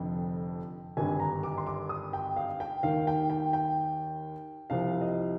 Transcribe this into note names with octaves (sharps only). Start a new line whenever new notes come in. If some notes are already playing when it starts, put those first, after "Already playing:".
Already playing: F1 F2 D3 F3 G5
G#1 G2 D3 G#5
A#5
D6
C6
D6
D#6
G5
F5
G5
D#2 D#3 F5
G5
G5
G5
C2 C3 F3 F5
D#5